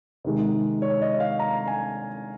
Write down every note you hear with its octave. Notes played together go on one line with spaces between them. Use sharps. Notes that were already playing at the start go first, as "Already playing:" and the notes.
C3 D#3 G#3
C#5
D#5
F5
A#5
G#5